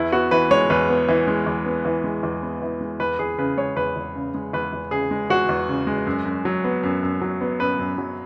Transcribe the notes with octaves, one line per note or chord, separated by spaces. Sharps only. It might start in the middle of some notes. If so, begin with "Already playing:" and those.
Already playing: E2 E4
B3 F#4
E3 B4
G#3 C#5
E2 B4
B3
E3
G#3
E2
B3
E3
G#3
E2
B3
E3
G#3
E2 B4
E2 G#4
C#3 B4
G#3 C#5
E2 B4
E2
C#3
G#3
E2 B4
E2
C#3 G#4
G#3
E2 F#4
E2
C#3
G#3
F#2
F#2
F#3
B3
F#2
F#2
F#3
B3
F#2 B4
F#2
F#3